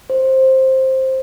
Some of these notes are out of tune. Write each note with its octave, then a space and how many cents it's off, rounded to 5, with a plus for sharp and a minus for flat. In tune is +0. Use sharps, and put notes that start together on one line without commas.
C5 +10